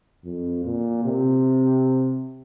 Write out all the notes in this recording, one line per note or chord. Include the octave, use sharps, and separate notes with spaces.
F2
A#2
C3